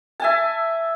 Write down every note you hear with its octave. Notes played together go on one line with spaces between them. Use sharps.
E5 G#5 A5